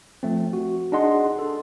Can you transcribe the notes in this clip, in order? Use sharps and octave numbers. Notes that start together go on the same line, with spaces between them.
F3 A3 C4
F#4
D4 D#4 G#4 D#5 F#5 C6
A4